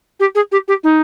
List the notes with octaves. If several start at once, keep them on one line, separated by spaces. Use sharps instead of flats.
G4
G#4
G4
G4
D#4